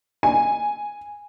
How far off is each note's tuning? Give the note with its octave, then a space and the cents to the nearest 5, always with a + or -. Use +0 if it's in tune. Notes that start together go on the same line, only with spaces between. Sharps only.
G#5 -5